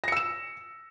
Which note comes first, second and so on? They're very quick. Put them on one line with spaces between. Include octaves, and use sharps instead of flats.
A#6 C#7 E6 E7